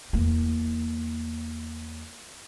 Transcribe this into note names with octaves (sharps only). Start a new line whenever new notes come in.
E2 A#3